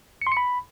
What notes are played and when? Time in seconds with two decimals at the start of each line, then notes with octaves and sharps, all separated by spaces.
0.22 C#7
0.27 C6
0.32 C#7
0.37 B5